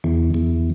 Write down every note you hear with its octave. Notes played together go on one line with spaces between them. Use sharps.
E2
E2